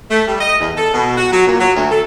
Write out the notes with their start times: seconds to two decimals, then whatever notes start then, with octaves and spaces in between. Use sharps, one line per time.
0.11 A3
0.28 G3
0.40 D#5
0.60 E2
0.77 A4
0.94 B2
1.17 F#4
1.32 F#3
1.46 A#2
1.60 F#3
1.75 D2
1.91 A4